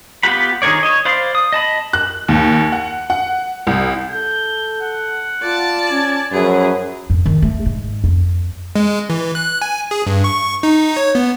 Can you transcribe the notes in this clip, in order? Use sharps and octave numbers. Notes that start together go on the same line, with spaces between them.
B3 F4 G4 F#5 B5
D#3 G#4 A#4 C#5 D5
C#5 D#5
C5 D5 F5 B5 C6
D#6
D#5 A5 B5
F#6
D#2
F#5
F#5
C2
A4 G6
F#5
F4 D5 A5
C#4 G#6
F#2 F3 G#4 B4
F2
D#3
A3
G#2
F2
G#3
E3
F#6
G#5
G#4
G2
C#6
D#4
C#5
B3